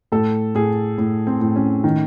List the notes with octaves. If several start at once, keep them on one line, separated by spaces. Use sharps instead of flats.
A2 A4
A2 G#4
A2
C4
A2
C#4
D#3